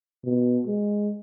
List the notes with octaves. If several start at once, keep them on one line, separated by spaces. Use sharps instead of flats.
B2
G#3